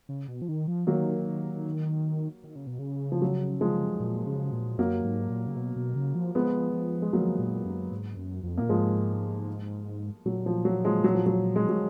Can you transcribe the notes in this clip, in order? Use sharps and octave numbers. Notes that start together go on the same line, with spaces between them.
C#3
B2
F3
D#3
F3
D#3 F#3 A#3
D#3
C#3
B2
C#3
F3
F#3
F3 G#3
A#2
C#3
A#2
F#2 F#3 A#3
G#2
A#2
C#3
B2
B2
C#3
F3
F3 G#3 B3
F3
G#3
F3 F#3 A#3
A#2
F#2
G#2
F#2
F2
A#2 A#3
G#2 F3 G#3
A#2 F#3
F3
F#3
F3 G#3
F#3
F3
F#3
G#3
F#3